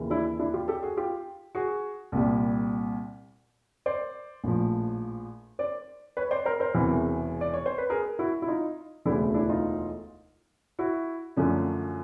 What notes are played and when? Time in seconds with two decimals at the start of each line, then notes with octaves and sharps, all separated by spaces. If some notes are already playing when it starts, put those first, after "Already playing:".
Already playing: D#2 C#3 E3
0.10 D4 E4
0.39 D4 E4
0.54 F4 G4
0.68 G4 A4
0.83 F#4 G#4
0.97 F4 G4
1.55 F#4 G#4
2.12 C2 A#2 G3
3.86 C5 D5
4.44 A#1 A2 F3
5.59 C5 D5
6.17 B4 C#5
6.31 C5 D5
6.46 A#4 C5
6.60 A#4 C5
6.74 E1 E2 C3 E3
7.41 D5
7.54 C#5
7.66 C5
7.78 B4
7.90 G#4 A#4
8.19 E4 F#4
8.42 E4
8.48 D#4 F4
9.05 E1 D2 C#3 E3 A3 D4 E4
9.34 D4 E4
9.49 D#4 F4
10.79 E4 F#4
11.37 F#2 D3 F3 A3 C#4